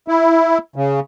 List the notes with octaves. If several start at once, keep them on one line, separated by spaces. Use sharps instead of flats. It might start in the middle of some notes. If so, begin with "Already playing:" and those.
E4
C#3